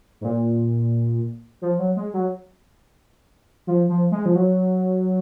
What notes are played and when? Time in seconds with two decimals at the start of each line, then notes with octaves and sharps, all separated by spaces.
0.21 G#2
0.25 A#2
1.62 F3
1.79 F#3
1.97 G#3
2.14 F#3
3.67 F3
3.89 F3
4.12 G#3
4.26 F3
4.36 F#3